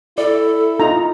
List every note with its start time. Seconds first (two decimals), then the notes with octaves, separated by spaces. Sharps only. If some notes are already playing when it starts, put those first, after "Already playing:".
0.18 E4 A4 D5
0.80 D#4 F4 A#5